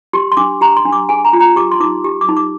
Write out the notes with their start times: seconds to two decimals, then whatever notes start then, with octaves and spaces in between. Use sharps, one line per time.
0.13 G4 C6
0.32 C6
0.37 D4 D6
0.61 G4 A#5
0.77 C6
0.85 D4
0.92 D6
1.09 G#4 G#5
1.25 A#5
1.33 F4
1.40 A#5
1.56 G4 D6
1.71 C6
1.80 D#4 D6
2.04 G4
2.21 D6
2.29 D#4
2.37 D6